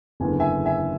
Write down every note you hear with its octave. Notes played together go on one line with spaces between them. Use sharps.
F#1 E2 D3 G#5
E5 G#5
E5 G#5